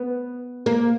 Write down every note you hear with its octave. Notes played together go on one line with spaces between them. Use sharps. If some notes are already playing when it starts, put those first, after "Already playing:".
Already playing: B3
A#3